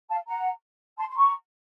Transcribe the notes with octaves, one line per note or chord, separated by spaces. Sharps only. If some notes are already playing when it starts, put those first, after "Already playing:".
F5 A5
F#5 A#5
A5 C6
C6
A#5 C#6